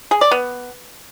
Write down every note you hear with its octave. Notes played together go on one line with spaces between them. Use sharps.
G#4
D5
B3